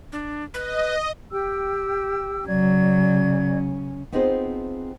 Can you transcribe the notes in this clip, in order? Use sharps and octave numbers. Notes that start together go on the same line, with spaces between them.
D4
B4 D#5
G4 G5 E6
C#3 F#3 C#4 D5 G#6
B3 C4 D#4 F4 G#4 C5